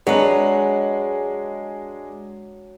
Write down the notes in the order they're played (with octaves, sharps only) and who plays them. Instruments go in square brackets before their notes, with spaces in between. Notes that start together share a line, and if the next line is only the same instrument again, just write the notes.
[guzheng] F#3 B4 [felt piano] G#3 D4